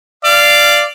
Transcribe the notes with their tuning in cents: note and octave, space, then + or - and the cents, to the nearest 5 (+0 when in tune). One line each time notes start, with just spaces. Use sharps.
D5 +0 F5 -15